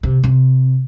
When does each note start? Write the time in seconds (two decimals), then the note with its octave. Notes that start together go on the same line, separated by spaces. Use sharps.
0.03 C3
0.23 C3